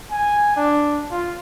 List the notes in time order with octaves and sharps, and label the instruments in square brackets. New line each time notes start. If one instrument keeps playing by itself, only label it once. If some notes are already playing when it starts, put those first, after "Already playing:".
[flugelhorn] G#5
D4
F4